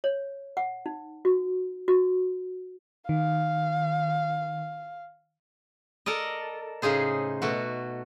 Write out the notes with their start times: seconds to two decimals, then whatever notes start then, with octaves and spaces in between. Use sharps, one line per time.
0.04 C#5
0.57 F#5
0.86 D#4
1.25 F#4
1.88 F#4
3.09 D#3 F5
6.06 A4 A#4 D5 D#5
6.82 A2 C#3 D#4 G#4 C5
7.42 B2 A3 F#4